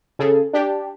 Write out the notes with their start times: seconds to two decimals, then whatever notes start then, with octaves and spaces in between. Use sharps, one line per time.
0.19 C#3 G#4 A4
0.53 D4 G4